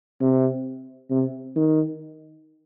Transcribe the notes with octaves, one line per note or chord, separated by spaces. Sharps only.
C3
C3
D#3